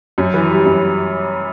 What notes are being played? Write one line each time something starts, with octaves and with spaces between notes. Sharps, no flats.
F#2
E3
G3
F#2